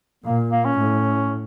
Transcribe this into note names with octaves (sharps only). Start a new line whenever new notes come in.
A#2 A#3
A#3
C#4
A2